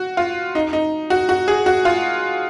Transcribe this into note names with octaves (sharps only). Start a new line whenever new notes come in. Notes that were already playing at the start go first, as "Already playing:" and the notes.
Already playing: F#4
F4
D#4
D#4
F#4
F#4
G#4
F#4
F4